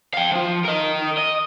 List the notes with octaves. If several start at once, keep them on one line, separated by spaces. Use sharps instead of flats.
F5 G5
F3 F4
A#4 D#5
D#5